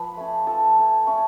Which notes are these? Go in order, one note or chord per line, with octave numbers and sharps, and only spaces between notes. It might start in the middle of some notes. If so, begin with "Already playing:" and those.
Already playing: F3 B4 B5
A3 C#4
F3 A4 A5
A3 C#4
A3 C#4 C#5